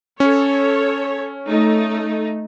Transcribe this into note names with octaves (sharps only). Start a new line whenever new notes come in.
C#4 A4 C#5
A3 D#4